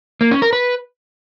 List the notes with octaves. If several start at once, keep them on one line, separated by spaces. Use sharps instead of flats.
A#3
C#4
A#4
B4